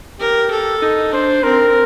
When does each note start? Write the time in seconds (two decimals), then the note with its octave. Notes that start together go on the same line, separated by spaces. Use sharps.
0.20 G4 A#4
0.51 A4
0.82 D#4 A4
1.12 D4 C5
1.44 C4 A#4